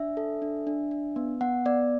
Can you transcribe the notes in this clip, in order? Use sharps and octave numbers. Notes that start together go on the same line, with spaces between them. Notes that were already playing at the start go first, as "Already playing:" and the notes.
Already playing: D4 E5
A4
D4
D4
D4
B3
B3 F#5
B3 D5